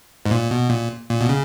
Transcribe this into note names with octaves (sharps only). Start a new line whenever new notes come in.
G#2
A#2
B2
A#2
A#2
B2
C#3